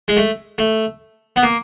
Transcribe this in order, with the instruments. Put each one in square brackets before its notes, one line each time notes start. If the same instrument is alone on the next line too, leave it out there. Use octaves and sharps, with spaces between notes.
[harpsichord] G#3
A3
A3
B3
A#3